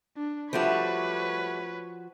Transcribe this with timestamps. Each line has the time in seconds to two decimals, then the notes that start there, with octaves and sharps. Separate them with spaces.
0.17 D4
0.53 F3 G3 A3 C4 F#4 B4 C#5